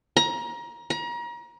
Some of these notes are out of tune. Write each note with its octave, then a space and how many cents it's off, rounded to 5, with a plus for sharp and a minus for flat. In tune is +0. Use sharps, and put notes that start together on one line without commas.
A#5 +25
A#5 +35